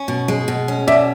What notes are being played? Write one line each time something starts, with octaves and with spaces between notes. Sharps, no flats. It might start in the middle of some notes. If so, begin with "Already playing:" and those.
Already playing: C#4
B2
G#3
B2
C#4
B2 D5 E5